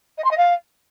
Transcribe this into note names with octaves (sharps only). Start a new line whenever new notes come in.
D#5
C6
D#5
F5